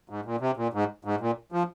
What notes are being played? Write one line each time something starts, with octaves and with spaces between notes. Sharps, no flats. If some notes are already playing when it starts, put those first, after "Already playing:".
G#2
A#2
C3
A#2
G#2
G#2
A#2
F3